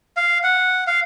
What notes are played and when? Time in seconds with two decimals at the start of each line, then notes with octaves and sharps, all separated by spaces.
0.17 F5
0.43 F#5
0.87 F5